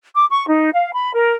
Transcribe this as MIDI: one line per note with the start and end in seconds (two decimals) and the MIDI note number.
0.14 0.25 86
0.31 0.47 85
0.48 0.70 63
0.74 0.91 77
0.93 1.12 83
1.14 1.36 70